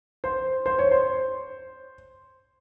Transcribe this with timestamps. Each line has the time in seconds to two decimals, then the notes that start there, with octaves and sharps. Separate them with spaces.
0.24 C5
0.66 C5
0.79 C#5
0.91 C5